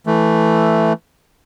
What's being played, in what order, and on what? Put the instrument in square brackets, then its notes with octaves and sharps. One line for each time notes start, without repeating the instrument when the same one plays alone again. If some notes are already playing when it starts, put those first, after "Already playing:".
[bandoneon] E3 A3